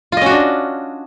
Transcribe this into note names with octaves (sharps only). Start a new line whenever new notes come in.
C#4 D4 F4 F#4 D#5